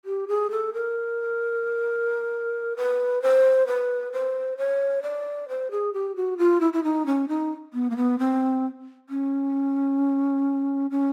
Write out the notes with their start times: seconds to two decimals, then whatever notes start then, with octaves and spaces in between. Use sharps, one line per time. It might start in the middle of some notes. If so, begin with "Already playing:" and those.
0.05 G4
0.28 G#4
0.51 A4
0.74 A#4
2.77 B4
3.22 C5
3.67 B4
4.12 C5
4.57 C#5
5.02 D5
5.48 C5
5.71 G#4
5.93 G4
6.16 F#4
6.38 F4
6.60 E4
6.73 E4
6.84 D#4
7.06 C#4
7.28 D#4
7.73 B3
7.90 A#3
7.96 B3
8.19 C4
9.09 C#4
10.91 C#4